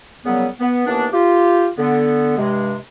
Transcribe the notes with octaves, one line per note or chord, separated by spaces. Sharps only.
A#2 C#3 F#3 G3 B3
B3
D#2 E3 A#3 B3 D4
F4 G4
D3 B3
G2 C3 G#3